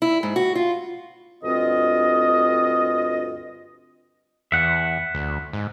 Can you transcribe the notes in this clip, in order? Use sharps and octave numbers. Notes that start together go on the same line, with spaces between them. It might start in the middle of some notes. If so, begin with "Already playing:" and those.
E4
G#2
F#4
F4
D2 G2 C4 F4 D#5
E2 E5 F#5
D2
G#2